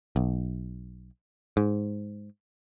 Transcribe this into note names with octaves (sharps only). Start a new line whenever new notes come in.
B1
G#2